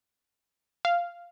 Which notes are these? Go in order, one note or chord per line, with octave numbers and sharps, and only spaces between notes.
F5